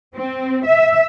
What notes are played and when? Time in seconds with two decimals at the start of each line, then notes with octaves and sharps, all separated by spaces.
0.15 C4
0.65 E5